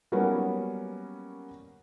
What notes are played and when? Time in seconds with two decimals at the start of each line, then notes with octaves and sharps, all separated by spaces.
0.12 F#3 G3 A#3 B3 C#4